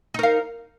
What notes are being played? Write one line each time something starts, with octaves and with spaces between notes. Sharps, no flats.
D#4 A#4 F5